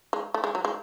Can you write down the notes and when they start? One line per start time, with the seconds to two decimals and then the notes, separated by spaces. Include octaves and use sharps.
0.13 G#3
0.34 A3
0.44 G#3
0.55 F#3
0.65 G#3